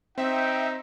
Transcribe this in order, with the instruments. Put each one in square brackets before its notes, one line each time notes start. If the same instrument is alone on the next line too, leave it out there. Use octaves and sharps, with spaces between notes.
[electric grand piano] C4 [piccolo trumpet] D#4 [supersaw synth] E5 [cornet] G5